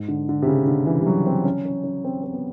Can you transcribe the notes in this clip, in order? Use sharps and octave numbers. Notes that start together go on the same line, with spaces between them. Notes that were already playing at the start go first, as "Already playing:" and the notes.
Already playing: G#2
D3
D3
C3
C#3
D3
E3
G3
F#3
C4
C#4
C#4
C#4
C4
C4
B3